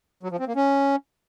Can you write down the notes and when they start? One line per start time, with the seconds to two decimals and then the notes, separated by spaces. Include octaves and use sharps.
0.23 F#3
0.31 F3
0.40 C4
0.48 A#3
0.56 C#4